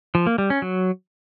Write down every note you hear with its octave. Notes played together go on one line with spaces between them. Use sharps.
F3
A#3
G3
C#4
F#3